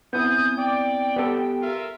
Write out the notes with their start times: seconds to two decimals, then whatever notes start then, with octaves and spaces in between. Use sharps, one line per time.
0.13 B3 C4 E4 G#5 D#6 G6
0.57 D5 G5
1.16 B3 G4 A4
1.61 F4 A#4 E5